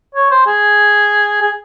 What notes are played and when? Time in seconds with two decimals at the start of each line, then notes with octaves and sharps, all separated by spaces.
0.15 C#5
0.31 C5
0.46 G#4
1.42 G#4